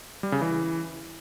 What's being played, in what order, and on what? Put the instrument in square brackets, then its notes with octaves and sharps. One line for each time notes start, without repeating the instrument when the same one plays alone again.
[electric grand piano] G3
C#3
E3